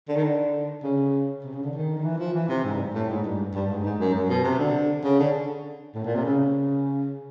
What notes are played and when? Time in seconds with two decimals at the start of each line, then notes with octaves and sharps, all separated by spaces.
0.08 D3
0.17 D#3
0.23 D3
0.83 C#3
1.44 C3
1.54 C#3
1.63 D3
1.74 D#3
1.97 D#3
2.04 E3
2.18 F3
2.34 E3
2.49 C3
2.64 G#2
2.74 G2
2.94 A2
3.09 G#2
3.24 G2
3.54 G2
3.69 G#2
3.84 G#2
3.99 F#2
4.14 F#2
4.30 B2
4.44 C3
4.59 D3
5.04 C#3
5.20 D3
5.95 A2
6.05 A#2
6.15 C3
6.24 C#3